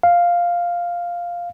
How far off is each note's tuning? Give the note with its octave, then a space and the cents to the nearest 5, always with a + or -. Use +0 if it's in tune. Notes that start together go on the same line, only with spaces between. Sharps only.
F5 +0